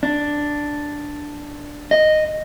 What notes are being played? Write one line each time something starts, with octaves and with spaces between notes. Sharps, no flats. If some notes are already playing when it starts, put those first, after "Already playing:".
D4
D#5